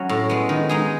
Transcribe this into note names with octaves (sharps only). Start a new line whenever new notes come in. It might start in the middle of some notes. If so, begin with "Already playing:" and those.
Already playing: F#3 C#4 E4
A2
G#3 B3
D#3
G#3 D#4 G#4